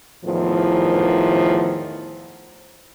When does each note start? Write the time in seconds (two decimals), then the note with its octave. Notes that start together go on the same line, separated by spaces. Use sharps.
0.25 E2 A2 D#3 F3